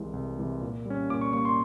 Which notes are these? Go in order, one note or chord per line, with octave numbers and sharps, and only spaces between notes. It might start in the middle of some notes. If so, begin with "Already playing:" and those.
Already playing: C2 C3 E3 G#3
C2
C3 E3 G#3
A#2
G3 A#3 C#4
A#2 D6
C#6
G3 A#3 C#4 C#6
C6